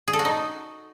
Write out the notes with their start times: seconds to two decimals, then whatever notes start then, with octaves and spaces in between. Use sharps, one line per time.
0.08 G#4
0.13 A4
0.19 F#4
0.25 D#4